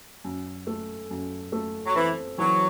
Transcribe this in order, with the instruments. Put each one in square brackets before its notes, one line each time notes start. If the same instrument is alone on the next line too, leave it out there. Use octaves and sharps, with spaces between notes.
[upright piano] F#2
A3
F#2
A3
[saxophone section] F#3
[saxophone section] E3 [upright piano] C4
[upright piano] E3 [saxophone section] F#3